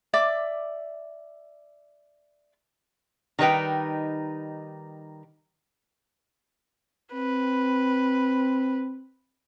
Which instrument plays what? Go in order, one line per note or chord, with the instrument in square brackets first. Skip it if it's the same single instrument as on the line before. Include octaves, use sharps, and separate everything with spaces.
[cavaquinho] D5 E5 D6
[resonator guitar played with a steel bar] D#3 G3 D#4 B4 G5
[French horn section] C4 [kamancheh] B4